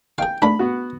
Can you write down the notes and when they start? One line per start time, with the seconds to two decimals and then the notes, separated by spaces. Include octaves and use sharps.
0.18 G#4 F5 G5
0.42 A3 D4 B5
0.59 B3 F#4